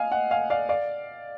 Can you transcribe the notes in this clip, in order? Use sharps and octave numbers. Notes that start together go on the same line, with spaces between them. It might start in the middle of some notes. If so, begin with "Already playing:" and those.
Already playing: D#5 F5 G#5
D#5 F#5
F5 G#5
D5 F5
D5 F5